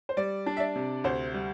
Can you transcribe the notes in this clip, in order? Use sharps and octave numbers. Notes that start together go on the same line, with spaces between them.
C5
G3 D5
D4
E5
D5
C3
D2 C5
G3